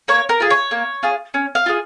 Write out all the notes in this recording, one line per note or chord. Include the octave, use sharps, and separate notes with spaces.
A#3 C#5
A#4
F4 G#4
C#5
A#3
F4 G#4
C#4
F5
F4 G#4